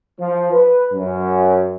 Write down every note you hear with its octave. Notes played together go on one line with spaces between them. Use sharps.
F3
B4
F#2